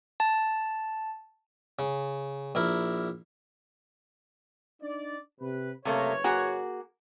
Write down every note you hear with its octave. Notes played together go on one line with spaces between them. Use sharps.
A5
C#3
A#1 E4 A#4
D4 D#4 D5
C3 B4
F#1 C3 A3 A#3 B4 C#5
A#3 F#4 G#4